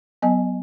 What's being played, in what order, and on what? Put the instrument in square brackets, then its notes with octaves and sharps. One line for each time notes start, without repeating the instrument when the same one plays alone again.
[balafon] F#3 B3 D#5 G#5